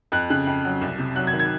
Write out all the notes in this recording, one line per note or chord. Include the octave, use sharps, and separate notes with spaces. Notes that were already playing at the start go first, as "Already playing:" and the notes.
F2 F#6
C#3 F#6
F2
F#3
C2
C3
F#3 F#6
G#6
D#3
G#6